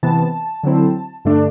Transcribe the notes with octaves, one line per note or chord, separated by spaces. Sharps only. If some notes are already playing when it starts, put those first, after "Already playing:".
C3 E3 B3 A5
D3 F#3 C4 E4
G2 D3 A3 D4